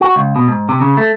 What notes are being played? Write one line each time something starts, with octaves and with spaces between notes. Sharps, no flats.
F#4
C#2
B2
G#2
C3
C#3
A3